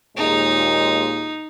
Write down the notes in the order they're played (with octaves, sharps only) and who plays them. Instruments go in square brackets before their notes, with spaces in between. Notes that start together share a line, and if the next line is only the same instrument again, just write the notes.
[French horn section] D#2 A#2 G#3 [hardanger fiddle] D#4